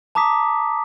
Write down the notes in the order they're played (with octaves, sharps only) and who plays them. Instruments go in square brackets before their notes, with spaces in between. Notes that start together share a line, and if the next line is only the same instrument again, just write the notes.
[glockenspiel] A5 A#5 D6 D#6 B6